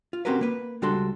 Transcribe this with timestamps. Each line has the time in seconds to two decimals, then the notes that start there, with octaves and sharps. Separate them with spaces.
0.13 F4
0.25 C4 C#4 F#4 G4 A#4 B4
0.41 A#3 B4
0.82 C#2 G3 D4 F#4 A4 C6